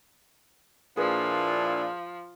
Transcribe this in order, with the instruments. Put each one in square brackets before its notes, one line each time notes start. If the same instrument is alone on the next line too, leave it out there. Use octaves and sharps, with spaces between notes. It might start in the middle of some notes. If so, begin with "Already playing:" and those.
[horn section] A#2 D4 E4 [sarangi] F3 [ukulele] G#4 B4